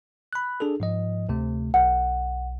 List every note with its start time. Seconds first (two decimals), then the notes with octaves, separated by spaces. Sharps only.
0.33 B5 F#6
0.60 D4 G#4 A4
0.80 G#2 F3 D#5
1.29 D2 C3 A3
1.74 B1 F#5